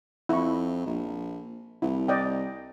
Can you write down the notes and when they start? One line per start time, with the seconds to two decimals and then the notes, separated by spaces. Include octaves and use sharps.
0.29 F2 E4 C#6
0.86 A#1
1.82 C2 E4
2.08 D5 D#5 G5